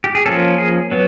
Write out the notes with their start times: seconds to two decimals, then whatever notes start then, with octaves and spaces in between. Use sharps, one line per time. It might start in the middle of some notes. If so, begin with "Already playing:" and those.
0.04 G4
0.15 G#4
0.26 F3 A#3 C#4 A4
0.58 G#4
0.91 F#3 B3